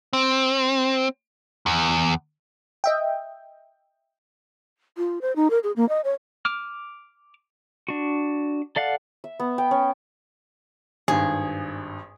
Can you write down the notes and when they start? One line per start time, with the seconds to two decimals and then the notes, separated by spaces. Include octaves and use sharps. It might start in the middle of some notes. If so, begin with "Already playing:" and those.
0.13 C4
1.66 E2
2.84 D#5 E5 G5
4.98 F4
5.22 C5
5.36 D#4
5.50 A#4
5.64 G#4
5.76 A#3
5.89 D#5
6.04 C#5
6.45 D6 F6
7.88 D4 F#4
8.76 A4 D5 F5 F#5
9.24 E5
9.40 B3
9.58 G5
9.71 C#4
11.08 G#1 G2 G#4